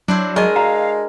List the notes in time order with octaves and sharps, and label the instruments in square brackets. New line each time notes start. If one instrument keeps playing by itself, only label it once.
[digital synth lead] F#3 [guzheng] D4 E4 C5
[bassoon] G#3 [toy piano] G#4 D#5 C#6 [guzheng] A#4 G#5
[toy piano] F#4 A#5 [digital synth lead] F5